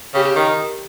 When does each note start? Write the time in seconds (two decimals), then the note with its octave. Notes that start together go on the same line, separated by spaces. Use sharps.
0.14 C#3 G4
0.36 D#3